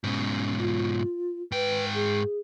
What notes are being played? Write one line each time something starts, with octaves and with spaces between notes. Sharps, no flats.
G#2 B2 C#4
F4
G#2 B4 G5
G#4